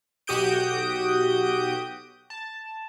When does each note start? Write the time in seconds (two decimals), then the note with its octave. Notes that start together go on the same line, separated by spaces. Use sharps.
0.27 B1 F#4 G4 D#6 G6 D7
2.30 A5